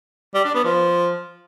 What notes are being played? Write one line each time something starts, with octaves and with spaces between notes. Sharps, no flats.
G3
D4
B3
F3